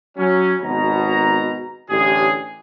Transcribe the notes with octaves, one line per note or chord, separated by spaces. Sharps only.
F#3 C#4
G#1 B2 A#5
A1 A2 D3 G4 G#4